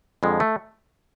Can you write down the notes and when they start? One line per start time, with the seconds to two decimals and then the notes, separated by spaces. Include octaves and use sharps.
0.23 F2 D3 F3 G#3
0.40 A3